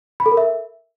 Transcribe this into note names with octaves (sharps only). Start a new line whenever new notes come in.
B5
A4
A#4
E5